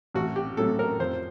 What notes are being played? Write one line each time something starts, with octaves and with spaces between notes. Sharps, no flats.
A1 F#4
G4
A2 F#3 A4
A#4
F2 C5